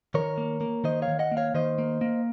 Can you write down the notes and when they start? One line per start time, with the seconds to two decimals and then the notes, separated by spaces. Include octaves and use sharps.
0.14 D#3 A#4 C#5
0.38 A#3
0.61 A#3
0.84 D#3 C5 D#5
1.02 C#5 F5
1.08 D#3
1.19 D#5 F#5
1.32 A#3
1.37 C#5 F5
1.54 D#3 C5 D#5
1.79 A#3
2.01 A#3